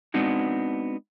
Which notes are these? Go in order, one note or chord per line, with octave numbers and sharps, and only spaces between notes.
G#3 B3 C4 D4 D#4 F#4